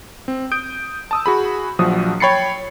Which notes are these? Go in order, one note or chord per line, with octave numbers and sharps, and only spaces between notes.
C4
D#6 G6 D7
A5 D#6 E6
F#4 G#4 B5
A#1 F3 F#3 F#4 D#6
C#5 G5 B5 A6 C7 C#7